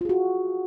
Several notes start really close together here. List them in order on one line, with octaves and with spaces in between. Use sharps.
F4 G#4 F#4